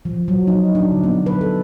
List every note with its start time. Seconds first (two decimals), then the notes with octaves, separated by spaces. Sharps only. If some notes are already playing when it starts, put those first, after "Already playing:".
0.05 F3
0.28 F#3
0.47 D#4
0.75 D4
0.92 D3
1.04 B3
1.26 B4
1.41 A4